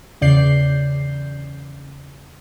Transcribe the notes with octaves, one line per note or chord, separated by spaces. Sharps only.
E2 C#3 D5 G6 C7